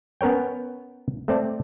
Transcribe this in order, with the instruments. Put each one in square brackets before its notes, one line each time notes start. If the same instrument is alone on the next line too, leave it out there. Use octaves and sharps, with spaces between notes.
[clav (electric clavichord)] B3 C#4 A#4 C#5 G5
A3 C4 D5 A5